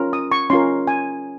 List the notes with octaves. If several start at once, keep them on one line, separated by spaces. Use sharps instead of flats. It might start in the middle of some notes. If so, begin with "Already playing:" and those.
Already playing: C#4 F4 A#4
D#6
C#6
C#4 F4 A#4 C6
G#5